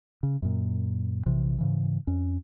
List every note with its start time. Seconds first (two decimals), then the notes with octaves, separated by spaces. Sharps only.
0.23 C#3
0.42 F#2 A#2
1.26 A#1 C3 E3
1.58 G#2 C#3 E3
2.07 F2 C#4